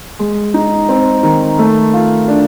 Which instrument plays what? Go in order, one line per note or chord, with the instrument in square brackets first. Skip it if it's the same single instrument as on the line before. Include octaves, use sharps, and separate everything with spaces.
[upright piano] G#3
D#4
C4
D#3
A3
F4
D4